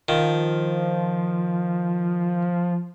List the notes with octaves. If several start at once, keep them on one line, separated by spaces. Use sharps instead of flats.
D#3 F3